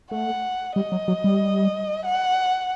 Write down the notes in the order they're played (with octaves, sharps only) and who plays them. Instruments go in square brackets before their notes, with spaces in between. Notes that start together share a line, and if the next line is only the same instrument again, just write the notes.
[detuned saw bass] A3 [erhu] F#5
[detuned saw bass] G3 [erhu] D#5
[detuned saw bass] F#3
F#3
G3
[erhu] F#5